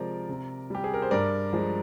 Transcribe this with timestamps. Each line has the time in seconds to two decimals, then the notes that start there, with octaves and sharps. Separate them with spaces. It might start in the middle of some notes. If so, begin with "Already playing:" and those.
Already playing: C3 F3 G#3 A#4 D5
0.29 C3
0.70 G3 G4
0.84 G#4
0.94 A#4
1.02 C5
1.11 G2 A#4 D5
1.53 F3 G#3